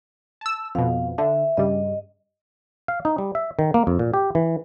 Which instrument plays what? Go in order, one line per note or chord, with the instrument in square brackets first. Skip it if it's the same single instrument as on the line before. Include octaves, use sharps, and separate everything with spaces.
[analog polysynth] A5 E6
[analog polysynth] F2 B2 [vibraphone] F5
[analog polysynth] D3 [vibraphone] E5
[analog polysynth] G2 C#3 G3 [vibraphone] D#5
[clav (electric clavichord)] F5
D#4
G3
E5
D#3
A#3
F2
A#2
G4
E3